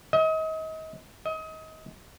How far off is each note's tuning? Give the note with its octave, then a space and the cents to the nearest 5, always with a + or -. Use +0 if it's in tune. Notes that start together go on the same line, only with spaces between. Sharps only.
D#5 +35
D#5 +30